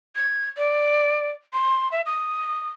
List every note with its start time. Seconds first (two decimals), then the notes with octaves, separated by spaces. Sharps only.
0.16 G#6
0.57 D5
1.53 C6
1.92 E5
2.06 D#6